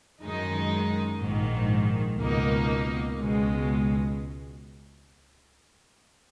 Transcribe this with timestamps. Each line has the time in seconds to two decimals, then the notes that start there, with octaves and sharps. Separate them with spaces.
0.23 F#2 D#3 G#3 D#4
1.21 A#1 G#2 D#3
2.18 C#2 B2 A#3 D#4
3.15 C#2 B2 G#3